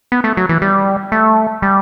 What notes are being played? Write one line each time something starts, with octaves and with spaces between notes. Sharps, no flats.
B3
A3
F#3
E3
G3
A3
G3